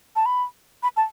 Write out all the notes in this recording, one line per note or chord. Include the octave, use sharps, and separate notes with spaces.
A5
B5
B5
A5